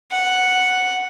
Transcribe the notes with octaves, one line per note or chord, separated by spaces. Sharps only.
F#5